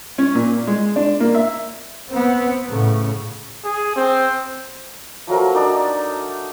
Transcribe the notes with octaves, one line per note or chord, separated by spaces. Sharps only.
C#4
A#2
G#3
D4
A#3
E5
B3 C4
A2 C#3
G#4
C4
F3 F#3 A3 A#4
D4 D#4 D5